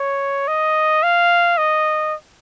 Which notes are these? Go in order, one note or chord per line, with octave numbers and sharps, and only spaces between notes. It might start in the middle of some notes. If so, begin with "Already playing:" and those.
Already playing: C#5
D#5
F5
D#5